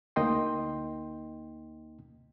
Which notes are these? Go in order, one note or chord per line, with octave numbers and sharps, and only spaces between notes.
D2 A#3 D#4 D#5 G5 C6